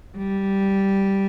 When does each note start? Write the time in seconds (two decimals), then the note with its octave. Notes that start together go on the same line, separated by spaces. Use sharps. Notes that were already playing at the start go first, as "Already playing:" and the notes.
0.17 G3